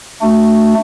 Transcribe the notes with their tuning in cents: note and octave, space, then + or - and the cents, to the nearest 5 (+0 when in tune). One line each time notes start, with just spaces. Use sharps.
A3 +0 D4 +10 F#4 +0